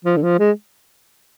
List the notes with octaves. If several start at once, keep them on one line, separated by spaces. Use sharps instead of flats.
F3
D3
F3
G#3